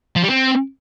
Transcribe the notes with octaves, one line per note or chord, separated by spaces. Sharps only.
F3
G3
C4